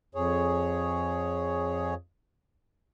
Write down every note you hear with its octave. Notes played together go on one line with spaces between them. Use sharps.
F2 G#4 C#5